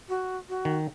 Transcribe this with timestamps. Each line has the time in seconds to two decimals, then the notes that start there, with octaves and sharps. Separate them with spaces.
0.09 F#4
0.49 F#4
0.65 D#3